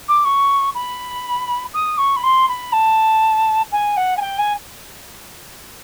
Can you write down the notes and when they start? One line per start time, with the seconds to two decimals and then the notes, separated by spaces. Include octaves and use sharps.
0.08 D6
0.25 C#6
0.75 B5
1.74 D#6
1.98 C#6
2.16 B5
2.23 C6
2.49 B5
2.73 A5
3.72 G#5
3.97 F#5
4.17 G#5
4.21 G5
4.38 G#5